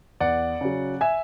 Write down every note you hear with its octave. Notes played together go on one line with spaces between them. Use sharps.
E2 D5 F#5
C#3 F#3
E5 G#5